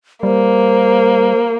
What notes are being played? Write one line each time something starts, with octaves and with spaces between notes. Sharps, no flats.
G3 A#3 C5